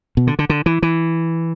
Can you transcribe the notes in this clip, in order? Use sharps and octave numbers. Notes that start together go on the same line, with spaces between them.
B2
D3
D3
D3
E3
E3